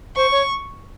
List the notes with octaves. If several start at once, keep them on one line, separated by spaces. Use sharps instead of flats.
C5 C#6
C#5